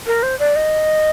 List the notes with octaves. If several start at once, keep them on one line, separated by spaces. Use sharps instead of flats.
A#4
C5
D5
D#5